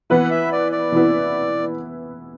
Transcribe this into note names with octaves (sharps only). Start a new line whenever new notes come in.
E3 B3 E4 B4 F#5
E5
D5
D5
E3 B3 E4 B4